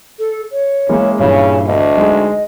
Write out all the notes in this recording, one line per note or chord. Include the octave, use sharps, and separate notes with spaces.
A4
C#5
C#3 E3 G#3 A#3
G2 A#2 C#3 E3 C#5
D2 D#5
G#3 D#4